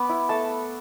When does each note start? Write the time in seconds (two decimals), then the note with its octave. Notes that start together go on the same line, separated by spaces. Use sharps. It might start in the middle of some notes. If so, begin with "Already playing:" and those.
Already playing: B3 B5 D6
0.09 E4
0.29 A3 A5